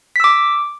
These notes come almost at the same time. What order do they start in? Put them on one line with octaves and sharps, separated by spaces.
B6 E6 D6